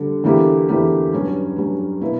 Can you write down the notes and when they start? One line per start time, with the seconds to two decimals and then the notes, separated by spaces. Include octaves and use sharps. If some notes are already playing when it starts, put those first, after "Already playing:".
Already playing: D3 G3
0.24 E2 D3 A#3 E4 G4
0.69 E2 D3 A#3 E4 G4
1.13 G2 F#3 C#4
1.56 G2 F#3 C#4
2.01 B2 A#3 E4